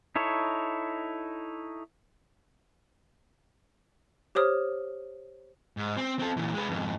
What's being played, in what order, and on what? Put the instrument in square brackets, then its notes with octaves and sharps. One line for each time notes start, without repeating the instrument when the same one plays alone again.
[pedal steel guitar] D#4 E4 A4 C#5
[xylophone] G4 C5 C#5 D#6 F6
[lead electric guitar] G#2
C4
C4 A4
A#2 E3
G#3 B4
F2 G#2